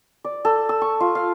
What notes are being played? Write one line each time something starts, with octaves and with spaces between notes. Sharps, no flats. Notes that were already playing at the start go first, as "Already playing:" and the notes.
D5
A4
E6
C#6
F4
F5